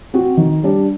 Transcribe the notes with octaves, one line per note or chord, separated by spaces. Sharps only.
C4 F#4
D#3
G3 D4